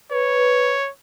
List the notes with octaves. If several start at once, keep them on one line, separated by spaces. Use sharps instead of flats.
B4 C#5